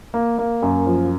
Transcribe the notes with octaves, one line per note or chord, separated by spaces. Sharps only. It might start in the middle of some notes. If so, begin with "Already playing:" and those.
A#3
A#3
F#2
F3